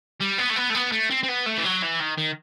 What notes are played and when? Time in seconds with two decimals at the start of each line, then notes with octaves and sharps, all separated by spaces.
0.20 G3
0.38 B3
0.49 A3
0.56 B3
0.70 A3
0.75 B3
0.92 A3
1.10 C4
1.23 C4
1.29 B3
1.46 A3
1.58 E3
1.65 F#3
1.82 E3
2.00 D#3
2.18 D#3